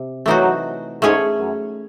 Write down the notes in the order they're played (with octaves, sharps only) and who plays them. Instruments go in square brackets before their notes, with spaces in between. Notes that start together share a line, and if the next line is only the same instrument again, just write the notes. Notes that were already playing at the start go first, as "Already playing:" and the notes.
Already playing: [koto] C3
[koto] E3 A3 D#4 F#4 C5 [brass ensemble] F#3
[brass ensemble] G#2 [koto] A3 C#4 G#4 C#5
[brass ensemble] F#2